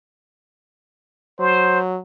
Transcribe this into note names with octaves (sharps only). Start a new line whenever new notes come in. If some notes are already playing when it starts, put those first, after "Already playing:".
F#3 C5